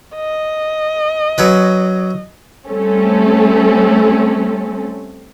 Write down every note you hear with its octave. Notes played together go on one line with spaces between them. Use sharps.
D#5
F#3 C#4 B4
G3 A3 C4 C#4 A4